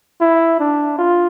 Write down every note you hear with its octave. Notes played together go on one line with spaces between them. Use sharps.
E4
D4
F4